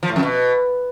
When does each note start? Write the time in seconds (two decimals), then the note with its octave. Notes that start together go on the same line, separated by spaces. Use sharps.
0.03 F3
0.09 A2
0.16 F2
0.23 B2